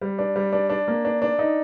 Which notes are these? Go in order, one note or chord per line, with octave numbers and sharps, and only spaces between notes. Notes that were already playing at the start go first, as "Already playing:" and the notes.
G3
D4
G3
D4
D4
A#3
D4
D4
D#4